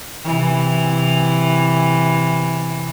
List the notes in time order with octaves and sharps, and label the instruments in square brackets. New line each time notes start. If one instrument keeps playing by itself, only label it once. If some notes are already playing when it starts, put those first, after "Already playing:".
[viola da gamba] C3 E3